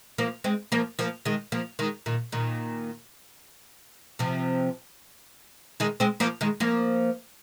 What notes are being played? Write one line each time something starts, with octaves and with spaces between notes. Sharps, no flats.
F3 A#3
G#3 C4
F3 A#3
F3 A#3
D#3 G#3
F3 A#3
D#3 G#3
A#2 D#3
A#2 D#3
C3 F3
D#3 G#3
G#3 C4
F3 A#3
D#3 G#3
F3 A#3